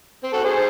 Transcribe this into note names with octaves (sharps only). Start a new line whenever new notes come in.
C4
F#4 A4
G#4 C5